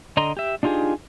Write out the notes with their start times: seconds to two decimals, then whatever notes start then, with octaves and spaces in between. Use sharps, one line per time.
0.17 D3 D#5 A#5 C6
0.37 G4 E5
0.63 D4 D#4 F4 G4 G#4